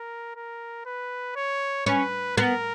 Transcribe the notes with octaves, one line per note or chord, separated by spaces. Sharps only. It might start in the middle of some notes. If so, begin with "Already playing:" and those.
Already playing: A#4
A#4
B4
C#5
C#4 B4
B3 A#4